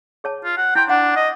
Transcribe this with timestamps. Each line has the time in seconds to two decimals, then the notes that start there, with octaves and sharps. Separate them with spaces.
0.24 G#4 C#5 A5
0.44 F4
0.57 F#5
0.75 E4 G5 B5 C6
0.89 D4 F#5
1.16 D#5